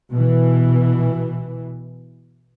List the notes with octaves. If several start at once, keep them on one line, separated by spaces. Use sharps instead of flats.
B2 E3